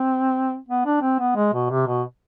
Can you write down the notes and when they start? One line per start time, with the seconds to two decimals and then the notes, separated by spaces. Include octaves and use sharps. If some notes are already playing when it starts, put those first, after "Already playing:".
Already playing: C4
0.69 B3
0.86 D4
1.01 C4
1.19 B3
1.36 G#3
1.54 B2
1.70 C3
1.87 B2